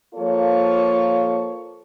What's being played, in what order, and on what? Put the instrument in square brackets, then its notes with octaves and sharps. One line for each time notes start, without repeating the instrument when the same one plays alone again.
[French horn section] F3 A#3 F4 A4 C#5